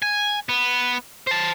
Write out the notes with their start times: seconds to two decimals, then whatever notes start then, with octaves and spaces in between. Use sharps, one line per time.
0.02 G#5
0.49 B3
1.27 C5 A5